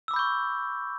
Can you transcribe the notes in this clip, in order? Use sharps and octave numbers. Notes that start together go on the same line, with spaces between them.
B5 C#6 D6 E6 G6